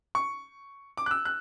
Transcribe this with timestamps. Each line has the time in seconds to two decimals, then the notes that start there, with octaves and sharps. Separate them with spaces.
0.15 C#6
0.97 D6
1.06 F#6
1.11 E6
1.25 F#6